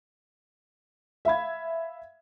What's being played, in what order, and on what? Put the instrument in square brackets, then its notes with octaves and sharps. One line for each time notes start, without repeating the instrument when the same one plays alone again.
[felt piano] E5 F5 B5 G#6